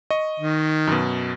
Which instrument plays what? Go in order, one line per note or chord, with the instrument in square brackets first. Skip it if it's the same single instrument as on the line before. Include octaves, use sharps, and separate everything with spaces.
[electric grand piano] D#5 C#6
[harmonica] D#3
[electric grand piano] F#2 B2